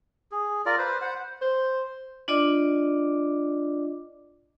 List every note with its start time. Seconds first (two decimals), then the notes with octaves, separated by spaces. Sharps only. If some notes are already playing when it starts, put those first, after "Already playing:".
0.32 G#4
0.66 F4 A#4 D5
0.78 B4 C5
1.02 C5 F#5
1.41 C5
2.28 D4 F4 D5 D#5 D6